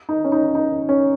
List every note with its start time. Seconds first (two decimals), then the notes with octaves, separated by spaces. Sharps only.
0.09 D#4
0.24 C#4
0.32 D#4
0.55 D#4
0.89 C#4